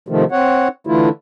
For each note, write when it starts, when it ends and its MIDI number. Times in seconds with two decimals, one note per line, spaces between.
0.08 0.24 48
0.08 0.24 51
0.08 0.24 53
0.08 0.24 57
0.32 0.68 60
0.32 0.68 73
0.32 0.68 78
0.87 1.09 50
0.87 1.09 52
0.87 1.09 57
0.87 1.09 64
0.87 1.09 65